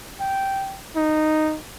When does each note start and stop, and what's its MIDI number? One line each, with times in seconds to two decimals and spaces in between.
0.20 0.78 79
0.96 1.56 63